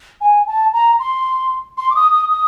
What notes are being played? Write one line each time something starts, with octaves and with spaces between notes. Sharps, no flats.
G#5
A5
A#5
C6
C6
D6
D#6
D#6
D#6